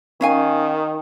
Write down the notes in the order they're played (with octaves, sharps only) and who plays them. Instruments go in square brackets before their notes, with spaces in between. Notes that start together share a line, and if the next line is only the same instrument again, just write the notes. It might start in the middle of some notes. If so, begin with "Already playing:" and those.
[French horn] D#3 [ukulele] C#4 F5 G#5